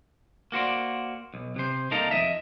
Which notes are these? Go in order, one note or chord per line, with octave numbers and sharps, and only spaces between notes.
A#3 F#4 C5 D5
B1
C3 C5
C2 A#3 D#4 A4 A#4 F5
F2 F#3 D#5 E5